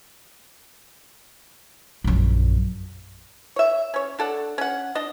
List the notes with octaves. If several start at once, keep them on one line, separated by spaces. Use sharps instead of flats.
A#1 F#2
C#5 E5
C#4 C#5
D4 A4 F#5
C#4 F#5
D4 D#5